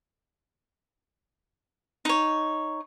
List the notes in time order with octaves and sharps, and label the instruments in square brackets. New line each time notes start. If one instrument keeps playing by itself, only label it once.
[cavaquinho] D#4 C#5